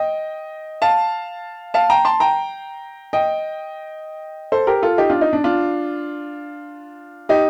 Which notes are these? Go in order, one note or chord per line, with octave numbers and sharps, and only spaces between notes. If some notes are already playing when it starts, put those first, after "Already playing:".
Already playing: D#5 G5
F5 A5
F5 A5
G5 A#5
A5 C6
G5 A#5
D#5 G5
A4 C5
G4 A#4
F4 A4
D#4 G4
D4 F4
D#4
D4
D4 F4
D#4 G4